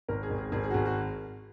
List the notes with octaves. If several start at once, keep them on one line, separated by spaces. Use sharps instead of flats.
G#1 A#4
G#4
G#1
G#4
G#1 G#4
G#4
F#4
G#1 G#4
F#4